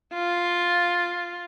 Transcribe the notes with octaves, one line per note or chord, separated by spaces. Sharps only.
F4